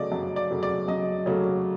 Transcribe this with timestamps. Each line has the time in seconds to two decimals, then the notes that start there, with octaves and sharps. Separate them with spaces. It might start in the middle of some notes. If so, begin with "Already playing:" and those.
Already playing: C#3 F#3 A3 D5 D#5
0.12 F#2
0.36 D5
0.50 C#3 F#3 A3
0.63 D5
0.88 F#2 D#5
1.26 C#3 F#3 A3